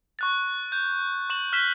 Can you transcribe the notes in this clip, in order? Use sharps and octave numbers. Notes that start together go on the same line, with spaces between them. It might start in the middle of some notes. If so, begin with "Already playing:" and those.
C#6 F#6 A6
G6
C#6 E7 F#7
F6 F#6 B6 E7 G7